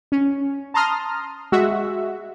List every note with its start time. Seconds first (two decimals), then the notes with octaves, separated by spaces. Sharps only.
0.12 C#4
0.74 A5 A#5 C6 D#6 F6
1.52 G#3 F#4 E5